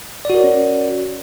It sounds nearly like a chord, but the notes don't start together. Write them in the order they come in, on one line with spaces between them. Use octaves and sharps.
D5 F#4 A#4 C#5 C#4